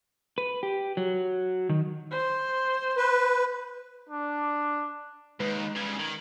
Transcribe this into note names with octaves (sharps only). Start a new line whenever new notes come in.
B4
G4
F#3
D#3
C5
B4
D4
D#2 G#3 D#4 B4
C#3 G3 G#6
D#3